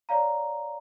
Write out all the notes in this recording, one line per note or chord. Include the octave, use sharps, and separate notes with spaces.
C#5 D5 F5 A#5